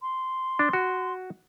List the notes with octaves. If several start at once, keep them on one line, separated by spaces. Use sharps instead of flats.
C6
D4
F#4